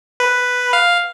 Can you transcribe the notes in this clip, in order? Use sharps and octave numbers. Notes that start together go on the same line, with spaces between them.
B4
F5